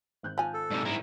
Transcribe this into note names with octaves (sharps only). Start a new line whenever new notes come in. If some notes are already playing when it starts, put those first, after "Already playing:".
G#1 F#6 G6
F3 G#5
A4
G#2 C3 D5
A1 G#2 E4 A#4